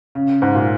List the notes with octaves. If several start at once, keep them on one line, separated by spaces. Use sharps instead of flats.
C#3
G#2
A#2